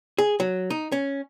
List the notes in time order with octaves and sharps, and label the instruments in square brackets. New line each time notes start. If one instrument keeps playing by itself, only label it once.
[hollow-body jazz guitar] G#4
F#3
D#4
C#4